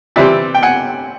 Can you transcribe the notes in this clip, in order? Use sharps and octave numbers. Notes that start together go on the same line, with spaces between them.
C3 E3 G3 C4 D5 E5
G5
F#5 G#5